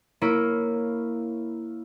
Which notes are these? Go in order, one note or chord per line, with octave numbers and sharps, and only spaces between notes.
A#3 E4 C#5 D7 D#7